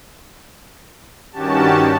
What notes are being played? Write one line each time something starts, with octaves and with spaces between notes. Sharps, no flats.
G2 D#3 C#4 F#4 G4 A5